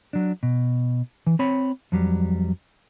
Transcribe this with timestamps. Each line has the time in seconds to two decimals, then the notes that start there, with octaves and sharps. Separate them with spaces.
0.13 F#3 D4
0.43 B2
1.27 E3
1.39 C4 C#5 B5
1.92 F2 F#3 G3